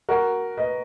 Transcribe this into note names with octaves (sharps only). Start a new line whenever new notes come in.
F#4 A#4
B4 D#5